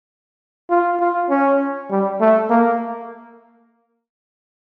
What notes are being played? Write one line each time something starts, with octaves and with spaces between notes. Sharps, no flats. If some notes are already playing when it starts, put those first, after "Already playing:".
F4
F4
C#4
G3
A3
A#3